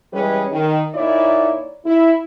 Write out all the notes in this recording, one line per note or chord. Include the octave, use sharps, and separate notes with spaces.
E3 G3 G#3 C#4 G#4 B4
D#3
A#2 D#4 E4 C#5 D5
E4